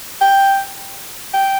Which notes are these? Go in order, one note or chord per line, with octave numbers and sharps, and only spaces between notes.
G5
G5